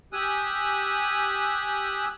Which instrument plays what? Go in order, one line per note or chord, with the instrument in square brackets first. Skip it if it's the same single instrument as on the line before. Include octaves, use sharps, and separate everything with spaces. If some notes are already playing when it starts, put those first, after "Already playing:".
[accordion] G4 G#5 D#6 E6 F#6